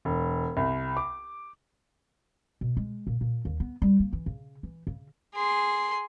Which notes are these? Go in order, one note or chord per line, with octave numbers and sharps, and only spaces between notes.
E1
C2
D6
B2
G#3
A#2
A#2
D#2
B3
G3
A#3
E3
C#3
E3
C#3
G#4 C6